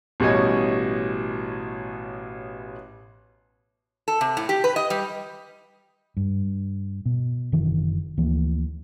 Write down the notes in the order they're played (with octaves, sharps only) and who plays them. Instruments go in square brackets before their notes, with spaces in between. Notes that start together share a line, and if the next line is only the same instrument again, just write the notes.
[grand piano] A1 B2 G3 C#5 D#5 G#5
[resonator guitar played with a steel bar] A4
C3
A2
G4
B4
D#5
G3
[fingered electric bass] G2
B2
F#1 C3 D#3 E3
D2 E3 F3 A#3